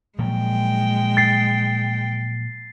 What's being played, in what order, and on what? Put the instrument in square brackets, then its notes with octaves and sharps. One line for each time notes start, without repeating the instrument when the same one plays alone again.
[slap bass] A#2 F3 F#3 [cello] G#3 G5
[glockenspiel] A6 C7